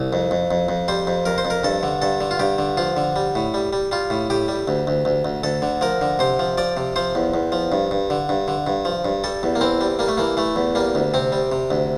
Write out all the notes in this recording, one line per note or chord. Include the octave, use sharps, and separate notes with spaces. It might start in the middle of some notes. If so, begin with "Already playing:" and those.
Already playing: C2
F2
F2
F2
F2
G3 C5
F2
F2 A#4
C5
F2
A#4
G2 A4
D3
G2 A4
D3
F4
G2 G4
D3
F3 F4
D3
G3
A2
G3
G3
G3 F4
A2
A2 G4
G3
D2
D2
D2
D2
D2 A4
D3
F3 A#4
D3
C3 C5
F3
F3 D5
C3
F3 C5
E2
E2
F3
G2
G2
D3
G2
D3
G2
F3
G2
G3 A4
E2
A#3
E3 C4
G3
G3 A#3
A3
E3 A#3
E3 A3
E2
G3 A#3
D2
C3 C4
G3
C3
D2